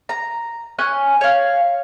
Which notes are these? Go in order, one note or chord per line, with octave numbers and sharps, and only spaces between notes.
A#5
C#4 G#5 F#6
C#5 F5